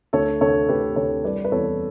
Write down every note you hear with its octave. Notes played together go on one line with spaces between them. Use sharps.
D2 A4 C#5
D2 A4 C#5
D2 G4 B4
D2 A4 C#5
G3 B4 D5
B4
E2 A4 C#5